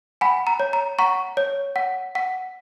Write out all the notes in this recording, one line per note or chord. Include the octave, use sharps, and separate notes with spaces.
F#5 G#5 B5
A#5
C#5
A#5
F#5 A#5 C#6
C#5
F#5
F#5